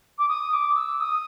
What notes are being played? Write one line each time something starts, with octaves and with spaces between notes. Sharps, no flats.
D6
D#6
D6
E6
D#6